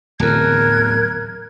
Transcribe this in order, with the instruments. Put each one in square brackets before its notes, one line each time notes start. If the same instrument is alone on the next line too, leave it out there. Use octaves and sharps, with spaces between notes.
[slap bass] D1 E2 [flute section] A#4 F#6 G#6